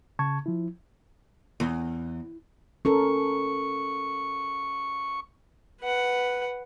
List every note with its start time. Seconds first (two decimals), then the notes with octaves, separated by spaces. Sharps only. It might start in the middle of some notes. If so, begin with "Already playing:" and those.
0.19 C#3 A5 C#6 G#6
0.46 F3 E4
1.60 E2
2.85 C#4 A4 A#4 C#6
5.81 B4 F#5